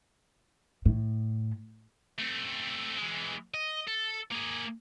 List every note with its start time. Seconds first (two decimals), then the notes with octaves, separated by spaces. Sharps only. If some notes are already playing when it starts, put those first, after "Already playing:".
0.85 A2
2.19 A3 C4
2.98 E3 G#3
3.54 D#5
3.87 A4
4.31 A#3 G#4